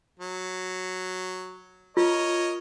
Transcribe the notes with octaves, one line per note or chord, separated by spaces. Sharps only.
F#3
F4 A#4 C#5 D#5